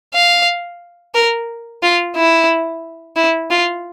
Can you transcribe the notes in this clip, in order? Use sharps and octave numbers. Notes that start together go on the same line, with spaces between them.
F5
A#4
F4
E4
E4
F4